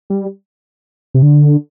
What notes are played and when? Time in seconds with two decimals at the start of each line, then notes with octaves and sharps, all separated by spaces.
0.10 G3
1.14 C3
1.22 D3